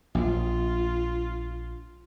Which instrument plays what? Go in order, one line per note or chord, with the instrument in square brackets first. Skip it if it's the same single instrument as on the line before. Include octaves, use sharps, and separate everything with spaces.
[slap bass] A#1 [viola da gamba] F4